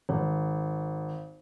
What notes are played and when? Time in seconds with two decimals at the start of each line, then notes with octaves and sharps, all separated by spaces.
0.09 G#1